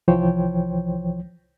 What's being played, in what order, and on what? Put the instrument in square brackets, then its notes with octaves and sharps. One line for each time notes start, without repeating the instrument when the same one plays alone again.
[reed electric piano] C2 E3 F3 C5 C#5 G5